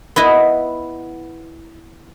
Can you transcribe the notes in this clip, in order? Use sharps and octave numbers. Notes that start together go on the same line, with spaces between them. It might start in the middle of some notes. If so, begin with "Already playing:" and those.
B3 E4 D#5